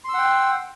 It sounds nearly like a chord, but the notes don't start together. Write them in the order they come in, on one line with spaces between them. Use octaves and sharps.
C6 E6 F#5 G5